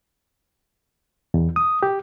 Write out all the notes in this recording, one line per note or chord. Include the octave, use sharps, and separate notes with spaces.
E2
D#6
G4